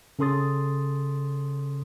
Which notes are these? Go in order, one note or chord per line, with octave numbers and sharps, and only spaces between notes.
C#3 C#4 A4 C6 D#6 A6